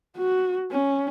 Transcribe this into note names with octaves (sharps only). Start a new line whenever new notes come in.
F#4
C#4